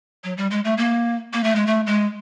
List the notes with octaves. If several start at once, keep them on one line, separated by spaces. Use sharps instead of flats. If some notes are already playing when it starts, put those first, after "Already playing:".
F#3
G3
G#3
A3
A#3
A#3
A3
G#3
A3
G#3